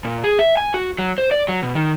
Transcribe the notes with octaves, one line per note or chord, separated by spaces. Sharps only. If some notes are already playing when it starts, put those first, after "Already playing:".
A#2
G#4
E5
G#5
F#4
F#3
C5
D5
F#3
B2
D#3